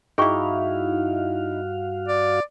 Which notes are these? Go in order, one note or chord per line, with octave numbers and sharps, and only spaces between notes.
G2 D#4 E4 F#4 G#4 F5 G5 C#6
D5